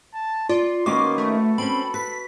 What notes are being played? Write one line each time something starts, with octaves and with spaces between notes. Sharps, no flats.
A5
F4 D5 C6
D#3 A#3 C#4 F#4 B4 D6
A3 A4
C4 C#4 B5
B4 B6